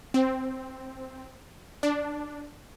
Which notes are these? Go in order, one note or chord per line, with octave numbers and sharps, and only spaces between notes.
C4
D4